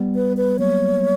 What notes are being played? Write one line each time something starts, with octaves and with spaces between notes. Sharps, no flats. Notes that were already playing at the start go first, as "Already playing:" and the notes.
Already playing: G3 B3
B4
B4
F#3 A#3 C#5